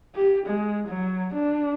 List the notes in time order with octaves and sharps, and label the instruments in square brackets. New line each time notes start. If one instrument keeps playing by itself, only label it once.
[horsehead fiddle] G4
G#3
F#3
D4